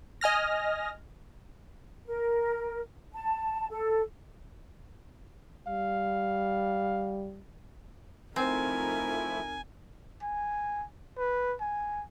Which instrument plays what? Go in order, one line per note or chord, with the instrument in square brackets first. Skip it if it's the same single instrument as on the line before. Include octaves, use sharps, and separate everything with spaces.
[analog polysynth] D#5 G#5 F6 A#6
[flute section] A#4
A5
A4
[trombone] G3 [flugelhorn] F5
[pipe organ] F3 A3 E4 [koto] C4 [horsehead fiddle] D#4 A#4 [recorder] G#5
[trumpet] G#5
B4
G#5